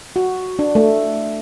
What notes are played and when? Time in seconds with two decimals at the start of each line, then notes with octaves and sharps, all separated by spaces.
0.16 F#4
0.59 D4
0.75 A3